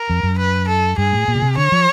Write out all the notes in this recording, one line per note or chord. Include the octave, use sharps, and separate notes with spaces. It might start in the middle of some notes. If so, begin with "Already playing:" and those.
Already playing: A#4
F2
F#2
B4
A4
G2 G#4
A2
A#2
B2
C3
D3 C#5
F3